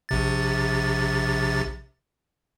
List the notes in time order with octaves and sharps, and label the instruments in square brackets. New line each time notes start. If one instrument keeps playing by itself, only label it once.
[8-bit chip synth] A#1 C3 A6